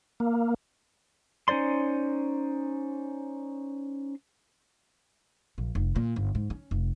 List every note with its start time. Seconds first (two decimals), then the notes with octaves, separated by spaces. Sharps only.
0.20 A#3
1.48 C#4 D#4 C5 D5 C6
5.58 A#1
5.75 F1
5.96 A#2
6.16 G1
6.35 G#2
6.50 C#4
6.71 F1